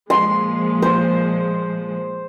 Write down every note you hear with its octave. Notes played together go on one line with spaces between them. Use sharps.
A#2 F3 G#3 C6
C5